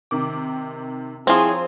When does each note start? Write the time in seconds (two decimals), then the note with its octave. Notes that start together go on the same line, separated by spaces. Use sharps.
0.11 C3 D#3 D6
1.27 F3 C4 E4 G#4 C#5 A#5 C6